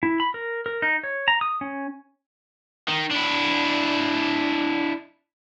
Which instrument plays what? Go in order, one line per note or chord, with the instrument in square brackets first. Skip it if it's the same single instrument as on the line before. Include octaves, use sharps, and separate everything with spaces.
[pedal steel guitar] E4
B5
A#4
A#4
D#4
C#5
A#5
D#6
C#4
[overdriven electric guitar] D#3
D4 E4